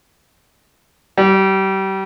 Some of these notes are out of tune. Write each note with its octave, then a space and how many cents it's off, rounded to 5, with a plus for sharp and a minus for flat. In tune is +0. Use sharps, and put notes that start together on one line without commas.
G3 -30